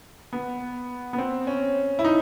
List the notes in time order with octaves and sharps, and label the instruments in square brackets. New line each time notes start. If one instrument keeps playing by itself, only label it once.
[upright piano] B3
B3
C4
C#4
E4
D#4